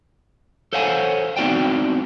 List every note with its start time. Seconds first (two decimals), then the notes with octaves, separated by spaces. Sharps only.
0.73 A4 C5 C#5 F5 F#5 G#5
1.37 B3 C4 D#4 F#4 D5 G5